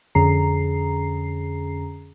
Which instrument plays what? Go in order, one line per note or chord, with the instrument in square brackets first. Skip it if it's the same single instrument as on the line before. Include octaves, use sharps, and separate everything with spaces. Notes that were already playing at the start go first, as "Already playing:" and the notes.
[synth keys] F2 D3 C#4 G#4 A#5 C7